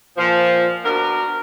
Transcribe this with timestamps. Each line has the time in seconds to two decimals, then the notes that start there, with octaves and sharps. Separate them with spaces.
0.18 A#2 F3
0.85 B3 D4 F#4 A#4